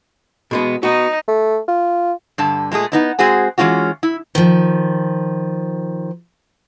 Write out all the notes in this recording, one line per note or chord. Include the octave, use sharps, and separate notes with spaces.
B2 G#3 B3
B3 D#4 F#4
A3
F4
G2 D3 A5
A#2 G#3 A3 G#4
B3 D#4 E4
G#3 C4 F#4 G#4 G#5
E3 G#3 C#4 F4 F#4
E4
D#3 F3